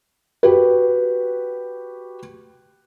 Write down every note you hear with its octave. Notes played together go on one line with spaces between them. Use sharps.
F#4 G4 B4